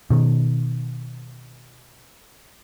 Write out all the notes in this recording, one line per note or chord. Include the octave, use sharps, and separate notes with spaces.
B2 D#3